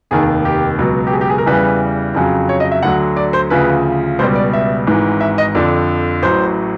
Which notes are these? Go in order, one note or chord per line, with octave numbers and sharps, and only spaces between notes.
F1 D#2 D#3 G#4
G4
C#2 B2 F#3
G4
G#4
G4
G#4
A#4
E2 C#3 E3 G3 B4
F2 C#3 F#3
C#5
D#5
E5
D2 D3 F#3 F#5
D5
C5
D2 C#3 F3 B4
C#2 B2 G3 C5
D5
E5
G#1 G#2 E3
E5
D#5
F2 D3 F3 D5
A1 A2 F#3 C5